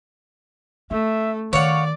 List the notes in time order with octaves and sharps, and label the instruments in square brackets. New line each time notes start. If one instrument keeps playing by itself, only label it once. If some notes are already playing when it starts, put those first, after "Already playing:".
[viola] A3 [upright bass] C#4 [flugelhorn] E5
[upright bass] D#3 [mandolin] C#5 F#5 [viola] D5 [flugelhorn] F5